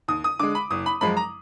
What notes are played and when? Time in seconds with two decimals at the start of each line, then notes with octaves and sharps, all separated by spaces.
0.08 D#2 D#6
0.24 D#6
0.39 D3 G#3 D6
0.55 B5
0.71 F#1 D#6
0.86 B5
1.01 F#2 F3 G#3 B5
1.17 A#5